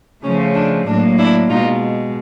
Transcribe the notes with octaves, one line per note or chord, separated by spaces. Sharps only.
C#3 F3 A3 C#4
D4
A2 F#3 A#3 D4
D4 E4
B2 G#3 D#4 F4